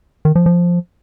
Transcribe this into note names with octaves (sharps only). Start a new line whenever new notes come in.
D#3
F3
F3